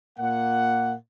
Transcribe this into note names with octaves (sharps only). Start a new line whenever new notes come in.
A#2 A#3 F#5